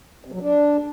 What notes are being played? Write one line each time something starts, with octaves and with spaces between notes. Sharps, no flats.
C3
F#3
D4